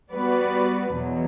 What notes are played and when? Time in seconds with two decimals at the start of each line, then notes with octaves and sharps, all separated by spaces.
0.12 G3 B3 F#4 B4 D5
0.92 E2 B2 F#3